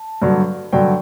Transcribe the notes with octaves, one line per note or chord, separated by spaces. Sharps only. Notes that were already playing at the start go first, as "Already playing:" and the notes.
Already playing: A5
G2 D3 F#3
G2 D3 F#3 G5